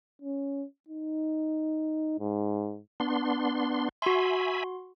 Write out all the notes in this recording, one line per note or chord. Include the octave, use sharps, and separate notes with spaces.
C#4
D#4
G#2
B3 D4 C6
F#4 E5 G#5 B5 C6